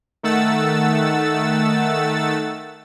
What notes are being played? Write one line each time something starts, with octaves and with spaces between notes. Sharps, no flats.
D#3 A3 F#5 E6 A6